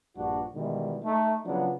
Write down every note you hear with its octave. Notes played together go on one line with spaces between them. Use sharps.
A#1 G2 D4 F#4
B2 D#3 E3 G3 G#3
A3 D#4
C#3 F3 F#3 B3 D4